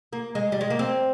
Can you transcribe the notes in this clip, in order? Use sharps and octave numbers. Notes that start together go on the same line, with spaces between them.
A#3
G#3
G3
G#3
A#3
C4